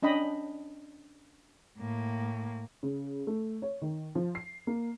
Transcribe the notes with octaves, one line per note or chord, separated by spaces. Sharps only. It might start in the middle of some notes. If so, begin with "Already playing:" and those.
C#4 D4 D#5 G5 B5
A2 A#3
C#3
A3
C#5
D#3
F3
C7
A#3